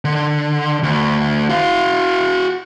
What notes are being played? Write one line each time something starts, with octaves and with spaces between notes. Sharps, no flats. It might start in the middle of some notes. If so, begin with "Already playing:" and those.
D3
D2
F#4 F5